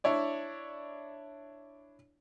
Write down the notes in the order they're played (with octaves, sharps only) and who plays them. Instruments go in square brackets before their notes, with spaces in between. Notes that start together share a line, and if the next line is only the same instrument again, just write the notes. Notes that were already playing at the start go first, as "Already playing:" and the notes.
[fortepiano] D4 E4 C#5 D5